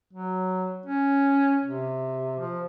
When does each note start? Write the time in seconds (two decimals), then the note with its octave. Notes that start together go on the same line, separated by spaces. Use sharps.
0.13 F#3
0.86 C#4
1.65 C3
2.39 F3